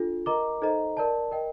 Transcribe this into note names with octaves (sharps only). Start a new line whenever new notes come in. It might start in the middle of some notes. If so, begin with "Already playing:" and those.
Already playing: D4 F4 A4
A#4 D#5 A#5 D6
D#4 A4 C5 D#5 A#5
A#4 D5 A5
A#4 D#5 G5